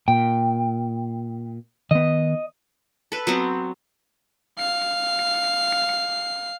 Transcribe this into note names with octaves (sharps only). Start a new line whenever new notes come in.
A#2 G5
D#3 B3 D#5
A4 B4
F#3 B3 C4
F5 C7